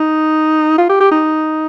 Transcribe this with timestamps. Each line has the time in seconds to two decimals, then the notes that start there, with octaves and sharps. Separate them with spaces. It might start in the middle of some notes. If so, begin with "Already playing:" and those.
Already playing: D#4
0.78 F4
0.89 G4
1.00 G4
1.11 D#4